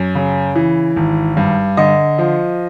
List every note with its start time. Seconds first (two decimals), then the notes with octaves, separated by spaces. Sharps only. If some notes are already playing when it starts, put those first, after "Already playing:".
Already playing: F#2
0.15 C#3
0.55 E3
0.96 G#1
1.37 G2
1.77 D3 D#5
2.18 F3